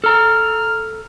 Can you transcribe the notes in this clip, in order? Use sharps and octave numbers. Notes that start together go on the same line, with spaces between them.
A4 A#5 F6